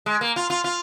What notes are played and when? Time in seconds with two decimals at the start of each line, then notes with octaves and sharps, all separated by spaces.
0.06 G#3
0.21 A#3
0.36 F4
0.50 F4
0.64 F4